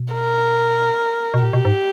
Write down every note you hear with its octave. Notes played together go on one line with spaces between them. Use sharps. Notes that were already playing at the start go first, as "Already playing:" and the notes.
Already playing: B2
A#4
B2
A#2 G4
B2
G#2